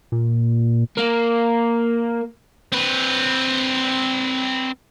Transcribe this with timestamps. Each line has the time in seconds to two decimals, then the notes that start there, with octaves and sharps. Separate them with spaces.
0.12 A#2
0.97 A#3
2.72 C4 B4